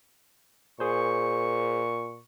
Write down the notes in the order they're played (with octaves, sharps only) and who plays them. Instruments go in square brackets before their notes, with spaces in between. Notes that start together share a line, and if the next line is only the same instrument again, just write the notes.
[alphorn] A#2 [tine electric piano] G#4 C5 [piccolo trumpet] C#6